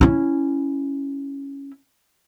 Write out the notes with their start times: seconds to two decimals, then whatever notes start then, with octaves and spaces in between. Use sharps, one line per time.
0.01 C#4 E4